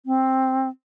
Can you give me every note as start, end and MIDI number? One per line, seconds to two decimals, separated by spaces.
0.06 0.69 60